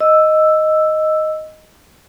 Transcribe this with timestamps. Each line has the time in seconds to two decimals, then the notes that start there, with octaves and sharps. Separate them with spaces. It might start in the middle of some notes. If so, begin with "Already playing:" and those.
0.01 D#5 E6